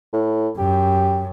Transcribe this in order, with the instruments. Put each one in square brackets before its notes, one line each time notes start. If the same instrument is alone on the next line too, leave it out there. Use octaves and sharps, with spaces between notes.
[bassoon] A2
[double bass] F#2 [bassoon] G4